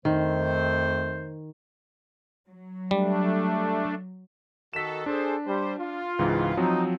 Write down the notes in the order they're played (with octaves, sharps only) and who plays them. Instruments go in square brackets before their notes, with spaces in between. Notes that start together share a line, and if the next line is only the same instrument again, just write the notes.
[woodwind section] F2 A3 C5 [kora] D#3
[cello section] F#3
[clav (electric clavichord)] G3 [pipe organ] A3 D4
[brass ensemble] D#3 F#4 A4 [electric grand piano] B6 E7
[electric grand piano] D4 [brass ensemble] G#4 A4 C5
[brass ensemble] G3 C5
F4
[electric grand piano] C#2 G#2 E3
[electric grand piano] F3 F#3 C4 [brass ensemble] D#4